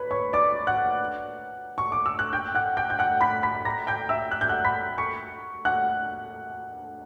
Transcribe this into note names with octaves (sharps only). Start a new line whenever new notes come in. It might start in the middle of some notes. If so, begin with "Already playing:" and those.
Already playing: B4 C#5 B5
C#5 C#6
D5 D6
F#5 F#6
C#6
D6
E6
F#6
G5 G6
F#5 F#6
G5 G6
G6
F#5 F#6
B5 B6
B5 B6
A#5 A#6
G5 G6
E5 E6
F#6
G6
F#5 F#6
B5 B6
C#6 C#7
F#5 F#6